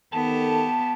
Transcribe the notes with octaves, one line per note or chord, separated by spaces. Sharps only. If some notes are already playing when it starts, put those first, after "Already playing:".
D#3 B3 G4 A4 A5